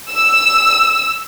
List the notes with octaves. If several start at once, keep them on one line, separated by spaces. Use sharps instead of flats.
E6